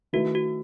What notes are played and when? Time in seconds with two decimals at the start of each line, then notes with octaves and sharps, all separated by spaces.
0.13 D#3 A3 E4 F#4 B4 E5
0.35 F#4